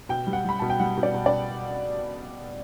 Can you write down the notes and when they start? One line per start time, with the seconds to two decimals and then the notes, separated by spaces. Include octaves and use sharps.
0.09 B2 G5
0.27 G3
0.33 F#5
0.45 G3 B5
0.59 B2 A5
0.70 G5
0.80 G3 F#5
0.97 B2
1.03 D5
1.14 B2
1.26 D5